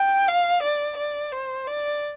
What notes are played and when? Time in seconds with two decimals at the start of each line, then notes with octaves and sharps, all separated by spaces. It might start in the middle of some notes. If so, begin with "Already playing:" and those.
Already playing: G5
0.28 F5
0.63 D5
0.97 D5
1.32 C5
1.67 D5